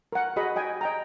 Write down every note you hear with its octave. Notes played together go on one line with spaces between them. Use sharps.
A#4 F#5
F#4 G#4 D#5 F#5 B5
D#5 G5 G#5
D#5 G5 A#5